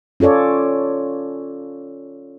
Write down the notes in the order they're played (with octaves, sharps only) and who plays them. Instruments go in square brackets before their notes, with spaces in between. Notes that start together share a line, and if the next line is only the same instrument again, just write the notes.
[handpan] C#4 F4 A4 C#5 D5